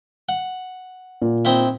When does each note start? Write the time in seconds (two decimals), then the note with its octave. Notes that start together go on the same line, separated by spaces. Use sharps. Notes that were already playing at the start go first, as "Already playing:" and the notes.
0.29 F#5
1.22 A#2
1.45 C4 D#4 E4